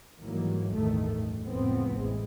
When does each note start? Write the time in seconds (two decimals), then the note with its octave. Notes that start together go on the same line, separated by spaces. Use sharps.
0.16 G#2 D#3 E3 F#3 G3 A#3
0.70 A1 E2 G2 D#3 A3
1.17 F#2
1.46 F1 C#2 A2 F3 B3 C4
1.95 A1 E3 G#3